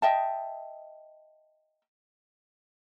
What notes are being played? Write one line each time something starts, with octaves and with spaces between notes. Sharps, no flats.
D#5 E5 G5 A5